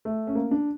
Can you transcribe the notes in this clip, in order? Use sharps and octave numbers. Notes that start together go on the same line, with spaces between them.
A3
C#4
A#3
D4